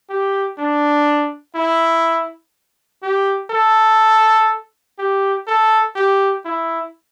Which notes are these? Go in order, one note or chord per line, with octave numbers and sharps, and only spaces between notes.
G4
D4
E4
G4
A4
G4
A4
G4
E4